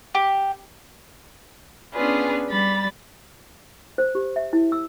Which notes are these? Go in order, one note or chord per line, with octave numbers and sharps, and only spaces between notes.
G4
B3 C#4 D4 F4 G#4 B4
G3 B5 A6
C5
G4
E5
E4
E6